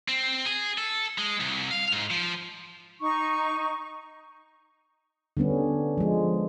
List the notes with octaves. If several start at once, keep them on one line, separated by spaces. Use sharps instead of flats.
C4
G#4
A4
G#3
C2
F5
G#2
F3
D#4 C#6
D3 G3 B3 C#4
F3 G#3